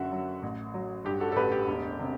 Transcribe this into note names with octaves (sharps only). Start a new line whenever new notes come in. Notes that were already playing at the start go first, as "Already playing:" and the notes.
Already playing: F#1 F#2 D3 F#4 E5 F#5
F#3
A1
F#3
G2 G4
F#4 A4
A4
A1 G4 B4
G4
E1
C3